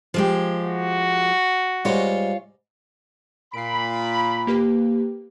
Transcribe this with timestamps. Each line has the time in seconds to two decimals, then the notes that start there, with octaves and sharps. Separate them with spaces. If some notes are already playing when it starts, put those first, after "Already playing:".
0.14 F3 G#3 G4
0.62 F#4
1.85 G#2 G3 F4 C#5
3.54 A#2 B5 C7 D7
4.47 A#3 G4 B4